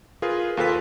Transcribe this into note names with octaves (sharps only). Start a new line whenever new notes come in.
F4 G#4 A#4 B4
D#2 F4 A4 B4 B6